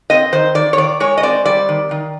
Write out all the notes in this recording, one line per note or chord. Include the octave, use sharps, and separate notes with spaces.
C4 D#5
D#3 C5
D#3 D5
C#5
D#3 D5
G#3 C#5
D#5
C4 D5
G3 D5
D#3
D#3